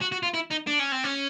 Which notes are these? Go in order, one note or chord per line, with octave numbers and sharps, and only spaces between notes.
F#4
F#4
F4
E4
D#4
D4
C#4
C4
C#4